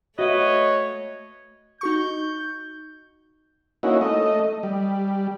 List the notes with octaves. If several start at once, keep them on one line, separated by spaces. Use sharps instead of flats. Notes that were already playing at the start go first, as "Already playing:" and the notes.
A3 F#4 B4 C#5 D#5 E5
D#4 F#4 C#6 G6
A#3 C#4 D#4 E4 F#4
A3 D#5
G3